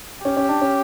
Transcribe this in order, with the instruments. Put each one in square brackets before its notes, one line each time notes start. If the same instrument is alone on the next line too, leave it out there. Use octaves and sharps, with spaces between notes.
[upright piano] C#4 [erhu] G4
[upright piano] C#4
D4
C#4